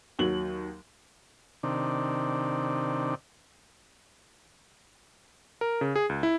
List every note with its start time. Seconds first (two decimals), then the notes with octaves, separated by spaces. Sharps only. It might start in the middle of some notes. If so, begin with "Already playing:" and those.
0.19 D#2 F#3 F#7
1.63 C3 D#3 D4
5.61 A#4
5.81 C#3
5.96 G#4
6.09 C#2
6.23 E4